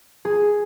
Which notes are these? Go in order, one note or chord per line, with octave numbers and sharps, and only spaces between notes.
G#4